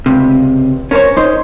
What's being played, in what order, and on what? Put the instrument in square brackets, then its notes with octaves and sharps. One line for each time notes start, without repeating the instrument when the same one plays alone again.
[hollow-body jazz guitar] C#2 C3
[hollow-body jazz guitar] C#4 [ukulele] A#4 C5 C#5
[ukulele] D#4 C5